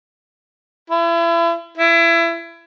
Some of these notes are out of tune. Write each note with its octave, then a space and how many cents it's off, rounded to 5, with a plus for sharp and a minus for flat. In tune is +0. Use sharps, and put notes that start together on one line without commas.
E4 +35
E4 +25